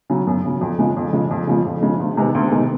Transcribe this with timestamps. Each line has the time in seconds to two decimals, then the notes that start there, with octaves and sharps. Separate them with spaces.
0.10 C#3 F#3
0.27 F#2
0.45 C#3 F#3
0.61 F2
0.79 C#3 F3 G#3
0.97 F2
1.13 C#3 F3 G#3
1.31 F2
1.47 C#3 F3 G#3
1.65 F2
1.82 C#3 F3 G#3
2.00 D2
2.17 C3 D#3 G#3 B3
2.35 D2
2.51 C3 D#3 G#3 B3